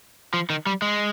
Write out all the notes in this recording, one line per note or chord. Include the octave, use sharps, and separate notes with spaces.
F3
D#3
G3
G#3